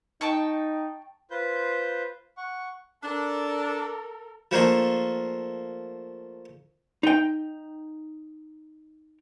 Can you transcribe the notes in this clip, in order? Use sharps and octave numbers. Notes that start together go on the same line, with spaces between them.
D#4 G5 A5 C#6
F4 B4 C5 G6
F#5 C#6
D4 A4 A#4
F3 A3 A#3 D4
D#4 G5